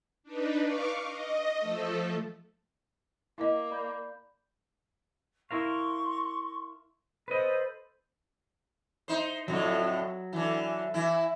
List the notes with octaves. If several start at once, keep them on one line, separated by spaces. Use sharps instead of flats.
D4 D#4 B4
F5 C#6 D6
D#5
F3 A3 A4
A#3 E4 D#5
D5 B5 G6
E4 A#4 F5 C6 C#6
A4 B4 C5 D#5 B5
D#4 C5
F2 A2 D3 F#3
D3 E3
E3 E4